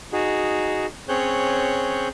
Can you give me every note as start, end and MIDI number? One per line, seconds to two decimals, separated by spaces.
0.13 0.86 63
0.13 0.86 66
0.13 0.86 68
1.09 2.08 60
1.09 2.08 61
1.09 2.08 68
1.09 2.08 73
1.09 2.08 90
1.09 2.08 91